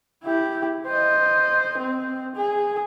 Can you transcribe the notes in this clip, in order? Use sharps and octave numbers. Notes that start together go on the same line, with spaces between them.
E4 G4
C5 D#5
C4
G#4